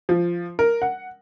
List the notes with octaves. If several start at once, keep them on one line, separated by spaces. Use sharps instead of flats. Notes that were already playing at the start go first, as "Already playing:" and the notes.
F3
A#4
F#5